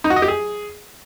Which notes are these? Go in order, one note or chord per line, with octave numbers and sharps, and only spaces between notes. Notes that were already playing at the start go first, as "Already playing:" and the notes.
D#4
F#4
D#5
G4
G#4